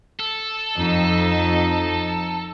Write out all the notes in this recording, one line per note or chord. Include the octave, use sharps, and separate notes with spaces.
A4
F2 D#4